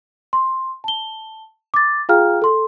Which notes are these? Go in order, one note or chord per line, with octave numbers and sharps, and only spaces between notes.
C6
A5 G7
D6 A6
F4 G#4 F5 G5 A#5 F6
A4 C6